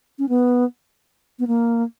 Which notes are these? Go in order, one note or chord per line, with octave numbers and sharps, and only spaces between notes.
C#4
B3
B3
A#3